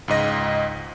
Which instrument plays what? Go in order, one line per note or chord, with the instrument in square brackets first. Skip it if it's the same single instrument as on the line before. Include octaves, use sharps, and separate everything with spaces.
[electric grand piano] C#2 G#2 D#5 A#6